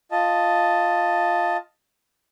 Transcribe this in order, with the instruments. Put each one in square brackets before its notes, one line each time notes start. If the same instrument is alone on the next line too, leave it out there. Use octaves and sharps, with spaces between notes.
[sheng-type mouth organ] F4 D#5 A5